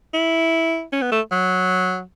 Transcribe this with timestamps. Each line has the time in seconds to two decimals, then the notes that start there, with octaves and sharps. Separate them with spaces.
0.13 E4
0.92 C#4
1.02 B3
1.12 A3
1.31 F#3